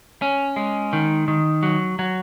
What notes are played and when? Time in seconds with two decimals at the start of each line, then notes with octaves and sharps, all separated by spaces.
0.22 C#4
0.56 G#3
0.93 D#3
1.28 D#3
1.63 F#3
1.99 F#3